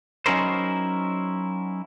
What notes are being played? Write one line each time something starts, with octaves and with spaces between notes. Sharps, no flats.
F#3 C#4 D#4 E4 A#4 C5